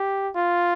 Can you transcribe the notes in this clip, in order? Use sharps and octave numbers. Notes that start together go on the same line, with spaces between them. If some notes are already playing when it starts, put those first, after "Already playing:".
Already playing: G4
F4